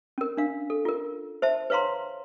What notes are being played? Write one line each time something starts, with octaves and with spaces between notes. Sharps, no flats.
C#4 A#4
D4 F5
A4
F4 A#4
C5 E5 A5
B4 C#5 F5 A#5 C6